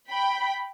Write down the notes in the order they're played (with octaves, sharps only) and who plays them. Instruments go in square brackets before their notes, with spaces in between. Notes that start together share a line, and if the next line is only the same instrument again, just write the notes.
[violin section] G5 B5